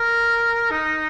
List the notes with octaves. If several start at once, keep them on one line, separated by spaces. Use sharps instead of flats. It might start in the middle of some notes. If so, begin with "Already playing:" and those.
Already playing: A#4
D#4